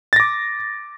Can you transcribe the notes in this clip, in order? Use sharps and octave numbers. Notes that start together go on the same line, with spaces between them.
D6 A6 A#6